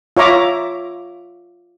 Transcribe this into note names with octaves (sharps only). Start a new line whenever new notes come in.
F4 C#5 E5 A#5 D6